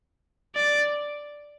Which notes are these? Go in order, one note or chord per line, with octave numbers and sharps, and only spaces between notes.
D5